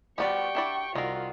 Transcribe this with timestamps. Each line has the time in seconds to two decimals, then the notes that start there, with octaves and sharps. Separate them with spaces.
0.18 F3 G3 B3 F#4 D5 G5 C#6
0.55 D4 E4 D5
0.95 C2 D#3 F4 F#4 A#4